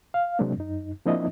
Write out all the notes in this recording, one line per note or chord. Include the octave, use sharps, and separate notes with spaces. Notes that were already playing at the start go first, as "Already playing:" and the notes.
F5
C3 F#3 G#3 A#3 C4 D4
F#2 D#4
F3 A#3 C4 D4 E4 D#5